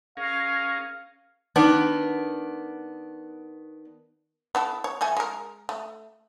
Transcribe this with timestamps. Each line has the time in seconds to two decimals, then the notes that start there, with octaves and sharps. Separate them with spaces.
0.17 C#4 G#4 A#4 F5
1.56 D#3 B3 D4
4.55 B3 E4 A4
4.84 C#5
5.01 E3 A3 G#5
5.17 G#3 A#4
5.69 A3